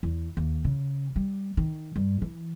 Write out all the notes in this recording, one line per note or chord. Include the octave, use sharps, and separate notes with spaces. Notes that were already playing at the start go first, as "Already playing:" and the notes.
E2
D#2
C#3
G3
D#3
G2
E3